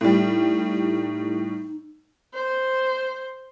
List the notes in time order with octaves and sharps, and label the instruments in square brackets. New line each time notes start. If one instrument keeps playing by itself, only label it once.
[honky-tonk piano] A2 G3 [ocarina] D#4
[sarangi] C5